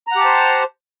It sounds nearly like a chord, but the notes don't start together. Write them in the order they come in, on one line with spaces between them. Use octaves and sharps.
A#5 F#5 G4 A5 C5